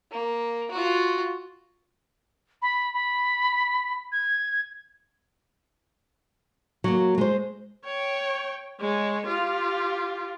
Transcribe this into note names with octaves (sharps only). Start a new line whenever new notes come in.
A#3
F4 F#4
B5
B5
G#6
F#3 A#3
G#3 C5
C#5 G5
G#3 C#5
F4 G4